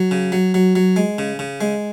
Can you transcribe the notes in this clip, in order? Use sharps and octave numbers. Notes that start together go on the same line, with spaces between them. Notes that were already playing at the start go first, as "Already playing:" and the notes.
Already playing: F#3
C#3
F#3
F#3
F#3
G#3
C#3
C#3
G#3